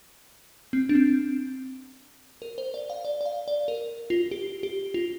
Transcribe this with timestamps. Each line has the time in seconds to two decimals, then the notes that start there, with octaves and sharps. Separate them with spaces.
0.73 C4
0.89 D4
0.95 C4
2.42 A#4
2.58 C5
2.74 D5
2.90 F5
3.05 D5
3.21 D5
3.26 F5
3.48 D5
3.68 A#4
4.10 F4
4.31 G4
4.63 G4
4.94 F4